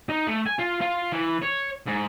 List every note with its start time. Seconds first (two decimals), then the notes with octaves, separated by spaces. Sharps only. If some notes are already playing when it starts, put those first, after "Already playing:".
0.09 D#4
0.27 A3
0.47 G#5
0.59 F4
0.81 F4
1.13 E3
1.43 C#5
1.87 G#2